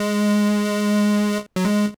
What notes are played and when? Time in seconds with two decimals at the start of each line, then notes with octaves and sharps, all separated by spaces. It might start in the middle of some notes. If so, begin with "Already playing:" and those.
Already playing: G#3
1.56 F#3
1.65 G#3